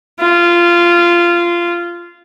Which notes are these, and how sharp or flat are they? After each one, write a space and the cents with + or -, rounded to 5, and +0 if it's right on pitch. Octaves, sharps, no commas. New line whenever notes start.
F4 -15